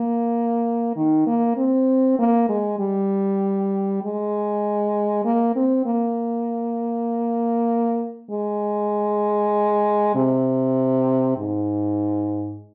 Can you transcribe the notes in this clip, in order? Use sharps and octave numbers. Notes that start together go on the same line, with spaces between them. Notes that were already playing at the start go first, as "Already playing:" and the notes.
Already playing: A#3
D#3
A#3
C4
A#3
G#3
G3
G#3
A#3
C4
A#3
G#3
C3
G#2